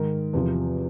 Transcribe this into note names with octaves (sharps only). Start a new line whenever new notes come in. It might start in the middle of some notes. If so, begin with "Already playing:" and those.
Already playing: G#2 D#3 A#4
E2 C3 F3